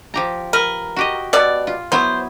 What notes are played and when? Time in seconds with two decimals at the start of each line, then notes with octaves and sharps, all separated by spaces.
0.14 F3 G4 A#5
0.53 A#4 B4
0.96 F#4 G4 D#5
1.33 B2 D5
1.67 F4
1.92 F#3 B3 E4 C5